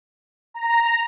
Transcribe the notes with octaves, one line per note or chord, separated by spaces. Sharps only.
A#5